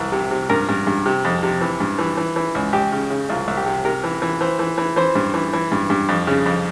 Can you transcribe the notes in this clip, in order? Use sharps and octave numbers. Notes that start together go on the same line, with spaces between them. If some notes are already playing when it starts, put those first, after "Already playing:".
Already playing: C2 E3
C3
C3
G2 A#4
G2
G2
C3
F2
C3
E3
G2
E3
E3
E3
C#2
C#2 G4
C#3
C#3
C2 F4
C2
G4
C3
C3 A#4
E3
E3
E3 C5
E3
E3
E3 C5
G2
E3
E3
G2
G2
F2
C#3
F2